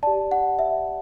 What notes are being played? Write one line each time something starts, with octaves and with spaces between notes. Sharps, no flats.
G4 D5 A5
F#5
E5